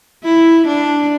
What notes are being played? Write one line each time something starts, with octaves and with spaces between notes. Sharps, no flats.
E4
D4